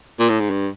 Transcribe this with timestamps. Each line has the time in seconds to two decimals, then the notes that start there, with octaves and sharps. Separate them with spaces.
0.19 A#2
0.29 A2
0.40 G#2
0.50 G2